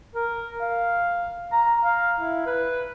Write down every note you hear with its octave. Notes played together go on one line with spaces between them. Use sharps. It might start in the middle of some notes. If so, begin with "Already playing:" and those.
A#4
F5
A#5
F5
E4
B4